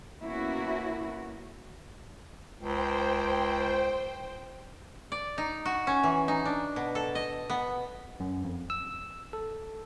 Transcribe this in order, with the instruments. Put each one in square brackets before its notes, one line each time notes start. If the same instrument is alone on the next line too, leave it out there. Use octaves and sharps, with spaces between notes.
[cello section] A#3 B3 C#4 E4 F#4
[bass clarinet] C#2 [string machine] C5 G5
[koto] D5
D#4
F#4
C#4
E3
D#4
D4
B2
A4
D#5
B3
[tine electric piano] F#2
F2
E6
A4